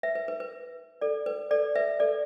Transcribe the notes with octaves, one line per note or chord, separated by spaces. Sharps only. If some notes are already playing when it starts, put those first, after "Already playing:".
B4 E5
B4
B4
B4
A4 D5
B4
A4 D5
B4 E5
A4 D5